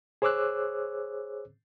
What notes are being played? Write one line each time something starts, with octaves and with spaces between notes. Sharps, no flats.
G#4 C5 C#5 D6 E6 F#6